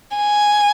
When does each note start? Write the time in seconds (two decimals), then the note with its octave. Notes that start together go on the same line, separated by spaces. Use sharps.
0.17 G#5